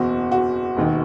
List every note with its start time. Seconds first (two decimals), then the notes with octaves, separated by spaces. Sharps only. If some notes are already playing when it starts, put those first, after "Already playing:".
Already playing: F#1 E2 B2 F#4
0.32 F#4
0.77 E1 D#2 D#3